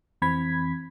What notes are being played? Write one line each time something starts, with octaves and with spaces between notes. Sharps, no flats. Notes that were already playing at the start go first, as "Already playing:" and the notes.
F2 E3 C4 B5 G#6 B6